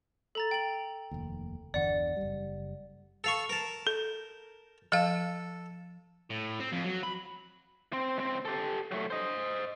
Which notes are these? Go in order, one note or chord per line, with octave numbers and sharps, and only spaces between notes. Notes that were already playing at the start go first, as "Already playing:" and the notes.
A4 A#5 A6
G5 F#7
F1 D#2
G1 E2 D3 D5 F#5
F#1 G3
A4 F5 C#6
A#4 A5
A4
F3 A4 F5
A2
C4
F2
F#3
B5
C4
C#2 C4
G4 A4
F#3 A3
C5 D#5